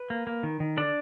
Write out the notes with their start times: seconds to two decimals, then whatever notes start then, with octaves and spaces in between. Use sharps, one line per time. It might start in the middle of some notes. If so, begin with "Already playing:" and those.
Already playing: B4
0.10 A#3
0.27 A#3
0.43 D#3
0.60 D#3
0.77 D3 D4 D5